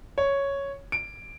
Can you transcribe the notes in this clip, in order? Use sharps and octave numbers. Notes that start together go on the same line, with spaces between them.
C#5
D7